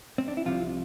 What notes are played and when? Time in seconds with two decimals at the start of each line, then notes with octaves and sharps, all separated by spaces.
0.18 C4
0.28 D4
0.37 E4
0.46 C2 C3 F3 F4